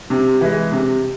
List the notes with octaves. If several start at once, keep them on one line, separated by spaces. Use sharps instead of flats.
C3
E3 G#3
C3